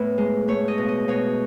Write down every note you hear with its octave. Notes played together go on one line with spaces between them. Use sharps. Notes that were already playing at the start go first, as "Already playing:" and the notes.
Already playing: A2 B3 B4
G#3
A3 C#5
D#5
B2
D#5
B2 C#5